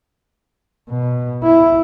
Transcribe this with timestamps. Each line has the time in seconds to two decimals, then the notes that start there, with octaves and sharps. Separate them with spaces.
0.89 B2
1.44 E4